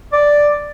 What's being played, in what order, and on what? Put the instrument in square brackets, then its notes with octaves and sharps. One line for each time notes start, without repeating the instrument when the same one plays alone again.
[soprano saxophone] D5